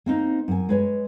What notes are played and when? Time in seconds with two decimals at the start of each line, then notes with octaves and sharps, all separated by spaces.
0.06 A#3 C4 D#4
0.48 F#2 G#5
0.69 G#3 B4 C#5